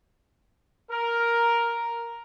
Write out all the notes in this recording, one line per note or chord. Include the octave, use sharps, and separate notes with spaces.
A#4